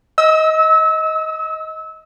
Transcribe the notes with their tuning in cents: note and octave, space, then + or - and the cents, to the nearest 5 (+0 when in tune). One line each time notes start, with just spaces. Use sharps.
D#5 +20 E6 -30